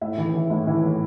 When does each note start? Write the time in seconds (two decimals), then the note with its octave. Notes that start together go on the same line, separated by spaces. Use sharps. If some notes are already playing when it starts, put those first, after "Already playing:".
0.01 A2 E5
0.17 E3
0.34 E3
0.50 A2
0.67 E3
0.84 A2